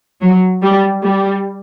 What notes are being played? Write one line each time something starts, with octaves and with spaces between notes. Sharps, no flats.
F#3
G3
G3